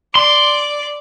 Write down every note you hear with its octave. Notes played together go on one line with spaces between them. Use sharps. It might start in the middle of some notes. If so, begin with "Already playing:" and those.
D5 C6 D6